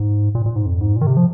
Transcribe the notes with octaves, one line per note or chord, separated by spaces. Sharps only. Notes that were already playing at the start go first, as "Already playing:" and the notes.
Already playing: G#2
A#2
A#2
G#2
F2
G#2
A#2
D#3
C3
F3